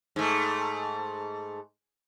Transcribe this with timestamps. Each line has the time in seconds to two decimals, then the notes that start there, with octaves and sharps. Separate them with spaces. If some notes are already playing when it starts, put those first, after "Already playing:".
0.16 G#2 A3